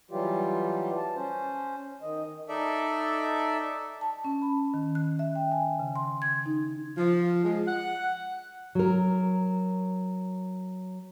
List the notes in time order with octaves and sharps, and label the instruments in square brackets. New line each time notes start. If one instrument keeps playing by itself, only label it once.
[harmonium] E3 F#3 G3 F4 G4
A5
C#4 C5
D#3 D#5
[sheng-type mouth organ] D#4 A4 D5 E5
[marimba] A5
C#4
B5
D#3
F#6
E5
G5
G#5
C#3
C6
G#6
D#4
[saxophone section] F3
G#3
F#5
[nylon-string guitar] F#3 A#4